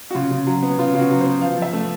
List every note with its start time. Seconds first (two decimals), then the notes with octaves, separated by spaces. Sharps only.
0.11 F#4
0.15 C#3 F4
0.31 C#3
0.47 F#3
0.63 B3
0.78 C#3 F4
0.94 C#3 F4
0.99 F#4
1.10 F#3
1.21 B3 C5
1.41 F3 F5
1.57 F3
1.62 E5
1.73 A3